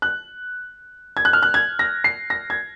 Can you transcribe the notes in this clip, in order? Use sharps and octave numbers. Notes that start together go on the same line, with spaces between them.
F#6
G#6
F#6
F6
F#6
G#6
A#6
C7
A#6
G#6